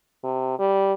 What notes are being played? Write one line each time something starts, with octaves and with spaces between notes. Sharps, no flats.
C3
G3